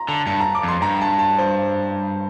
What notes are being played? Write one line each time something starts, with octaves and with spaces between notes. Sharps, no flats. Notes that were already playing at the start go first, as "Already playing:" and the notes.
Already playing: A#5 C6
D3 A5
G2 A5
A#5
D6
F2 C6
G2 A#5
A5
A5
C5